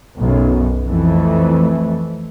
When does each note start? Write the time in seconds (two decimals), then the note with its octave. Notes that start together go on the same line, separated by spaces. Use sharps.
0.18 B1 F#2
0.86 F2 E3 A3